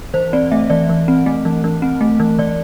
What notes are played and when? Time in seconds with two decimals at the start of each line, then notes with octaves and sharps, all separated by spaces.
0.14 E3 C5
0.33 C4 D5
0.52 A3 E5
0.70 E3 D5
0.89 E3
1.08 C4
1.26 A3
1.45 E3
1.64 E3
1.82 C4
2.01 A3
2.20 E3
2.39 E3 D5